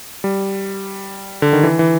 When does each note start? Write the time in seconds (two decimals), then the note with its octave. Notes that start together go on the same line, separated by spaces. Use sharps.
0.24 G3
1.42 D3
1.53 D#3
1.63 E3
1.79 E3